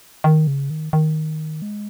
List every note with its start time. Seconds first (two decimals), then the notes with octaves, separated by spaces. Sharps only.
0.24 D#3
0.47 C#3
0.70 D#3
0.93 D#3
1.62 G#3